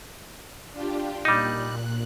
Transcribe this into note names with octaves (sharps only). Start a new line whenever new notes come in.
D4 F4 G4
A#2 G3 D#4 F#6